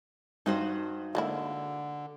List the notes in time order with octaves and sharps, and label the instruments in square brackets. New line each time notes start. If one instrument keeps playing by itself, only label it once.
[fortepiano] G2 [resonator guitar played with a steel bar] D#4 F#4 C5
[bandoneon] D3 [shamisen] G#3 A#3 E4